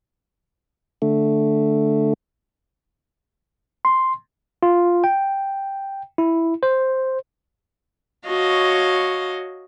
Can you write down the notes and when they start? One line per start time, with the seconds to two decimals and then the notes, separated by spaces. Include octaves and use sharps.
1.02 D3 A3
3.85 C6
4.63 F4
5.04 G5
6.18 E4
6.63 C5
8.27 F#4 C#5 D#5 F5 A5